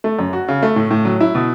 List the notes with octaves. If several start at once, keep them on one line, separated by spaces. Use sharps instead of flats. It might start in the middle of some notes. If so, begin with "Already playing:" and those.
A3
F#2
F#4
C#3
A3
A2
A2
F#3
E4
B2